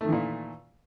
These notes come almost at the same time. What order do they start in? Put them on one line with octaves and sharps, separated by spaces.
A3 D#3 E3 A#2